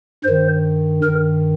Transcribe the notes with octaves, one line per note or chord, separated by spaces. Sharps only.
G2 D#3 C5
G2 D#3 A#4